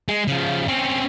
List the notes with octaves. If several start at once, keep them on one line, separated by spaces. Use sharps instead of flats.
G#3
C#3 F3
C4 C#4